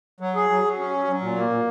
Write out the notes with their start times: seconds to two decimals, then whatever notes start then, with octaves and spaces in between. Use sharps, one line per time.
0.20 F#3
0.35 G#4
0.49 F#3
0.64 F#3
0.78 C#4
0.94 F#3
1.07 F#3
1.21 A#2
1.36 A#3
1.50 A#2